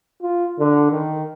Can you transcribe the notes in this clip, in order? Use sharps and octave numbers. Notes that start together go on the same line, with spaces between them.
F4
D3
D#3